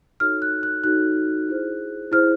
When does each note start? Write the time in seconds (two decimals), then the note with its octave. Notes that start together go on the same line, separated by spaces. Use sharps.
0.20 D#4 F#4 A4 C#5 F6
0.42 F#6
0.63 F#6
0.84 D#4 F#4 A4 C#5 F#6
1.49 E4 G#4 C5
2.12 E4 G#4 C5 F6